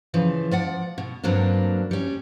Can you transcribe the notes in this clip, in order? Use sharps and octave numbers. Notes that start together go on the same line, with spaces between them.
C#3 E3 F3
F3 D5 F#5
B2
G2 F#3 A#3 C4 D4
G3 C#4